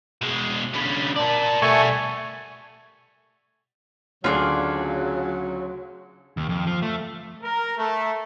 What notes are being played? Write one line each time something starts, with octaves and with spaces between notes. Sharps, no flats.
B2 G#3
D3 C#4 B5
A#4 D5 A5
B2 G3 A3 G#5 C#6
D2 C#3 F#3 F4 G#4 D5
D#2
F2
F3
A3
A#4
A3